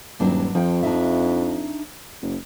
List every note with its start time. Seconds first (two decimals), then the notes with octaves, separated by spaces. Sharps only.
0.20 D#1 G2 F#3 D4
0.55 F2 F3 G5
0.83 D4 D#4 E5
2.22 F#1